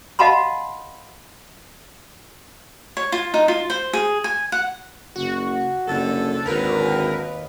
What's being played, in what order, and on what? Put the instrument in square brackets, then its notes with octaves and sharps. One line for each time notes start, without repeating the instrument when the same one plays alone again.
[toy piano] D#5 F5 F#5 A5 B5 C6
[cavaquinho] C#5
F4
D#4
F4
C5
G#4
G#5
F#5
[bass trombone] F#1 [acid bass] F#4
[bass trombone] F#1 [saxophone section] F2 D3 A4
[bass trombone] G#1 [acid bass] D#2 [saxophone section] D3 F#3 A#4 [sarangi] B4